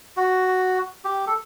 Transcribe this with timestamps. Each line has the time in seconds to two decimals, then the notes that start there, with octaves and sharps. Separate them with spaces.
0.17 F#4
1.05 G4
1.27 A4